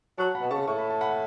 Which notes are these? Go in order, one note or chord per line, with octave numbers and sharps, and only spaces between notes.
F#3 A5 C#6
F#5 B5
B2
C#3 A5 C#6
A2 C#6
B5
A5
F#5 B5